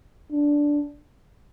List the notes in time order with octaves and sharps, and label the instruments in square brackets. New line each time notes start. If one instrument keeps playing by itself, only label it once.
[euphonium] D4